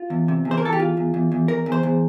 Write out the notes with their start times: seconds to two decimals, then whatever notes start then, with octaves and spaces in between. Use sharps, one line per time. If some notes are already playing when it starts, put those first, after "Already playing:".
Already playing: F4
0.10 E2
0.28 C3
0.45 E2
0.51 C5
0.57 A#4
0.62 E3 A4
0.73 G4
0.79 E2 F4
0.97 E2
1.14 E2
1.32 E2
1.48 E2 A#4
1.66 E2
1.72 C5
1.83 E2